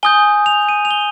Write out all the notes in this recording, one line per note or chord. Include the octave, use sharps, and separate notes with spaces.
G#5 D#6 G6 G7
F7
D#7
F7
G7